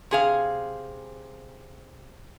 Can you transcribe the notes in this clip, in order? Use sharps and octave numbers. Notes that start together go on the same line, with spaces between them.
C3 G#4 F5